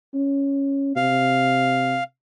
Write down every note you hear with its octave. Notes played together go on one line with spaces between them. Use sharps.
C#4
C3 F5